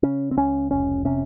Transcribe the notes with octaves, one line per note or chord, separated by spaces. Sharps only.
C#3 C#4
C4
C#2 C#4
F1 C#4
C3 C#4